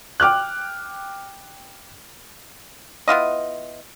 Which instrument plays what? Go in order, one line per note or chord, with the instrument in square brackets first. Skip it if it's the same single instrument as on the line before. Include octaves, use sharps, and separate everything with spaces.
[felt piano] G5 D6 F6 F#6
[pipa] B3 E4 F4 D#5